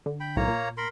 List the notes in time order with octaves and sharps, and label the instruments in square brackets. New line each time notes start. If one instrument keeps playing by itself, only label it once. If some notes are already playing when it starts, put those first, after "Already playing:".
[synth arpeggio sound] D3
[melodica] G5 B5
[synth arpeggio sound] B1 A2 [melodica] A#3 C#5 A#5
[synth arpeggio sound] A#2
[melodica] A#4 B5 C6